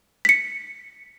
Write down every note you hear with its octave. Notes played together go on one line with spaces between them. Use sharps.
B6 C#7